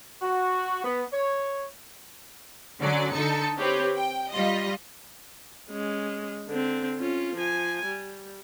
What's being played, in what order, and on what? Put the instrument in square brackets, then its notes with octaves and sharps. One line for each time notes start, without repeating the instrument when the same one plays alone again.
[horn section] F#4
B3
C#5
[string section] D3 F#3 C#4 D5
D3 D#4 A4 C#7
C4 G4 B4 C#5
G5
G3 F4 D#5
[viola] G#3 C#4
D3 C4
C#4 F4
F3 G#5
G3